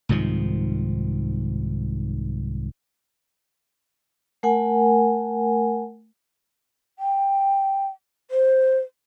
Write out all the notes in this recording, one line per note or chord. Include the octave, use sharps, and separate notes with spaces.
C2 G#2 D#3 F3
A3 A#4 F#5 G#5
G5
C5